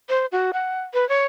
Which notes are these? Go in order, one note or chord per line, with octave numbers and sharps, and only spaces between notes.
C5
F#4
F#5
B4
C#5